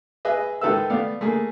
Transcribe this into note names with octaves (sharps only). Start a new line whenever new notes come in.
G#4 B4 D#5 E5
G#2 D#3 A4 B4 E5 E6
A3 B3 D5 F5
A3 A#3 G#4